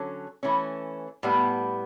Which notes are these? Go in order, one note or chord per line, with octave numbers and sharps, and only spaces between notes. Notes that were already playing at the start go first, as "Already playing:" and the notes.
Already playing: D3 F#3 C#4 A4
E3 A3 C#4
A2 G3 B3